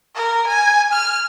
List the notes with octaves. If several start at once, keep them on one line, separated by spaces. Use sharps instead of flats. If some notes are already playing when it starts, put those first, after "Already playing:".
A#4
G#5
F6